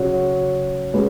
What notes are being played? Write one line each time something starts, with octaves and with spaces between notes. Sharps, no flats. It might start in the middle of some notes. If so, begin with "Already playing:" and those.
Already playing: C#3 F#3 C#4 F#4 C#5
G#3 C#4 F#4 B4